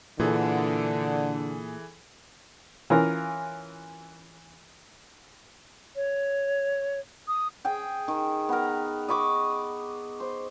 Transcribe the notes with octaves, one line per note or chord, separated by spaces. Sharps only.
A#2 D3 E3 G#4 A4
E3 C#4 F4 A#4
C#5
D#6
G#4 G5
D#3
B3 A#4
D#5 B5 C#6 D6
C5